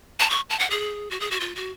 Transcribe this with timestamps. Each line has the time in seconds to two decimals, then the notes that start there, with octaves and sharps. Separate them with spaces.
0.20 A5
0.30 C#6
0.50 A5
0.59 F#5
0.70 G#4
1.11 F#4
1.20 G#4
1.31 F#4
1.40 F4
1.56 F#4